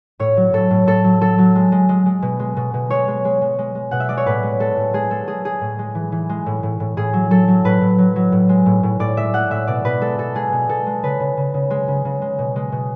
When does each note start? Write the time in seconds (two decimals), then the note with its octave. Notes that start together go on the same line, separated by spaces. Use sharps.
0.19 A2 C#5
0.37 F#3
0.53 A2 A4
0.70 A2
0.87 A2 A4
1.04 F#3
1.21 F#3 A4
1.38 F#3
1.55 G#3
1.72 G#3
1.89 G#3
2.06 G#3
2.22 B2
2.40 G#3
2.56 B2
2.74 B2
2.90 G#3 C#5
3.08 G#3
3.25 G#3
3.41 G#3
3.58 G#3
3.75 G#3
3.91 B2 F#5
4.00 E5
4.09 G#3 D5
4.17 C#5
4.26 A2 B4
4.43 G#3
4.60 G#3 A4
4.77 A2
4.93 G#3 G#4
5.10 G#3 A4
5.28 G#3 G#4
5.45 G#3 G#4
5.61 A2
5.79 G#3
5.95 E3
6.12 E3
6.29 G#3
6.46 A2
6.63 A2
6.80 A2
6.97 A2 G#4
7.13 F#3
7.30 F#3 A4
7.48 F#3
7.65 A2 B4
7.81 A2
7.98 F#3
8.16 F#3
8.32 A2
8.49 G#3
8.66 A2
8.83 A2
9.00 A2 D5
9.17 G#3 E5
9.33 G#3 F#5
9.51 A2 E5
9.67 B2 D5
9.85 B2 B4
10.02 G#3 A4
10.18 B2 A4
10.35 G#3 G#4
10.52 B2
10.69 B2 A4
10.87 G#3
11.03 C#3 B4
11.20 C#3
11.37 C#3
11.54 C#3
11.70 G#3
11.88 C#3
12.05 C#3
12.22 G#3
12.39 B2
12.56 G#3
12.72 B2